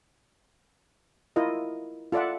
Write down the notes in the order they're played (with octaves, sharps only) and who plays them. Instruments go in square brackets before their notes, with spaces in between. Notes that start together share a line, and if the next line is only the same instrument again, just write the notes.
[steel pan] E4 F4 A#4 D#5
F4 A4 D5 E5 F#5